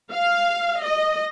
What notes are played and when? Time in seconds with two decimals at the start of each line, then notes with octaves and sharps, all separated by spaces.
0.13 F5
0.81 D#5